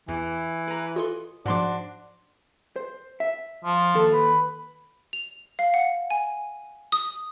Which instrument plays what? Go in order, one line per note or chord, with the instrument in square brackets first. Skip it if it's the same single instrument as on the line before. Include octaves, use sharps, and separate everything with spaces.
[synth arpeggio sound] E2 [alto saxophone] E3
[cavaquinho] B4 A#5
[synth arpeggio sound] F4 A4 C6 [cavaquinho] D#5
[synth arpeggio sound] G#2 F3 [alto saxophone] D4 [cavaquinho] F#4 C6 D6
[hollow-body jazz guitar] C5
E5
[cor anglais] F3
[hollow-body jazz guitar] D#2 A4
[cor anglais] B4
[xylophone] F7
F5
F#5
G#5
D#6